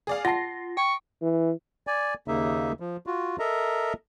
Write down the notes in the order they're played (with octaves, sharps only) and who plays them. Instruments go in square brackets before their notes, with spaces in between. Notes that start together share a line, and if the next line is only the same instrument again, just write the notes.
[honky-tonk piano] G#4 D5 F5
[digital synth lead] F4 [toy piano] F#5 A5 [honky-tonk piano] A#6 C7
[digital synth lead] G5 [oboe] C#6
[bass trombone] E3
[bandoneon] D5 G#5
D#2 C#3 A#3 D#4 E5
F3
F4 F#4
A4 A#4 D#5 E5 A#5